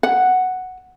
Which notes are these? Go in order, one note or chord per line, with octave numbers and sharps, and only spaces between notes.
F#5